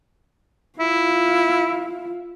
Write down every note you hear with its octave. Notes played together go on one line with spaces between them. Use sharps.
E4 F4